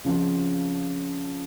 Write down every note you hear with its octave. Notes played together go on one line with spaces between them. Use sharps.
C#3 F3 C4 F4